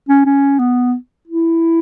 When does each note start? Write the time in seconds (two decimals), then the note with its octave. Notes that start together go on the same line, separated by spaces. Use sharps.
0.09 C#4
0.26 C#4
0.59 B3
1.28 E4